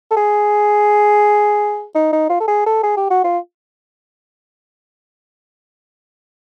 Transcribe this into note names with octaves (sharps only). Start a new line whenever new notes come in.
A4
G#4
D#4
D#4
F4
A4
G#4
A4
G#4
G4
F#4
F4